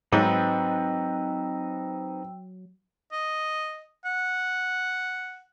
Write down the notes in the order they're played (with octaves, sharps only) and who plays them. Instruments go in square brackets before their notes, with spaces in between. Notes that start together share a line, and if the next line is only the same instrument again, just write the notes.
[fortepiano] G#2 [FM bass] F#3 [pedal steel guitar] C4 D#4 B4 [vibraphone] G5 E6
[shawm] D#5
F#5